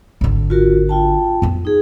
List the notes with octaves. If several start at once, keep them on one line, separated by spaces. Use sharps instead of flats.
G#1 D3
F4 F#4 A#4
F4 G5 A5
F2 B3
D#4 G#4